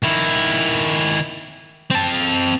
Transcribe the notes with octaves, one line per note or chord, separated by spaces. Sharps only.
D#3 E4
C4 A5